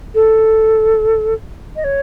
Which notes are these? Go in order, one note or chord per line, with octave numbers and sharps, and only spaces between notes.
A4
D#5
C#5